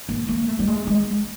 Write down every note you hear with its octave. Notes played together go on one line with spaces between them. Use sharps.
A#3
A#3
A3
G3
G#3
G#3